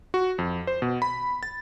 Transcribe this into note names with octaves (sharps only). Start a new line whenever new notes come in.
F#4
F2
C5
B2
B5
A6